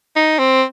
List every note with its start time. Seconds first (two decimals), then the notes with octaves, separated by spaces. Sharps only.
0.16 D#4
0.39 C4